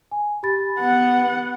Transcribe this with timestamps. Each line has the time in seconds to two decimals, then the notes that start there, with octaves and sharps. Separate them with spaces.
0.11 G#5
0.43 G4 B5 A6
0.79 B3 F#5